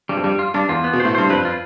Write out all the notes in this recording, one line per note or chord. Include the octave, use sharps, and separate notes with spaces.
G2 G3
F2
G2 G3
F4
G2 D4
E2 F4
B3
B2
C5
A2
G2 C5
F2 B4
F4